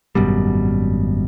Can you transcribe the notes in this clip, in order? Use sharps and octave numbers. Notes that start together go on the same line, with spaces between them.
G#1 F#2 B2 G3